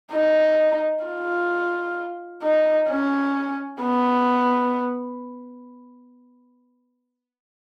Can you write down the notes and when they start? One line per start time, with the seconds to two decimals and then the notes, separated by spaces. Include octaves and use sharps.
0.12 D#4
1.04 F4
2.42 D#4
2.88 C#4
3.82 B3